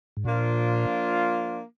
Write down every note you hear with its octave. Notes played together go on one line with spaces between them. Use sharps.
G#2
A#2 F3 A#3 D4 F4